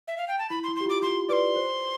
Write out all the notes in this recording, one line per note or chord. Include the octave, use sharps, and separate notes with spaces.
E5
F5
G5
A5
E4 B5
C6
E4
C6
G4
F4
D6
F4 C6
B4 D5 D6
C6
C5